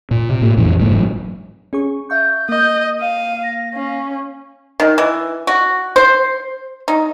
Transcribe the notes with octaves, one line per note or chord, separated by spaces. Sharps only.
A#2
C3
A2 A#3
A#1 F2 A#2 E3
F#1 G#2 G#3 A#3
A1 F#3
C#4 G#4 C#6
E5 F5 C#6 G6
A#3 D#5
F5 D#7
A#6
C#4 F5
D#3
E3
F#4
C5
D#4